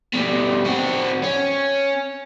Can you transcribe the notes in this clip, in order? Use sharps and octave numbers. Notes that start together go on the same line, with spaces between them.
B2 G3
C4 F#4
C#4